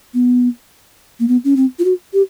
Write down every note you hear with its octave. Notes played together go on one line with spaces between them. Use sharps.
B3
A#3
B3
C#4
C4
F4
F#4
G4